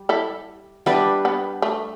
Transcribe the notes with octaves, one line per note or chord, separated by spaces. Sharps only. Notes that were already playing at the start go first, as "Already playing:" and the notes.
Already playing: G3
E4 A4
G3 B3 D4 E4 B4
B3
A3